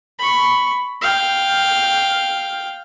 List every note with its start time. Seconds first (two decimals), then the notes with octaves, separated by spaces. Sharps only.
0.19 B5 C#6
1.01 F5 G5